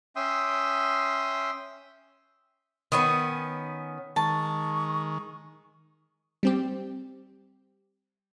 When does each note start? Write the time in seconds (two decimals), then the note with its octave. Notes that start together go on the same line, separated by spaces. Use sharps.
0.16 C#4 E5 G5 C6 D#6
2.92 D#3 B3 C#4
4.16 D#3 G#3 A5 C#6
6.43 G3 C4 G4